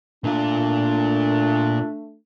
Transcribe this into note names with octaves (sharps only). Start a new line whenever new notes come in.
A#2 A3 D4 F4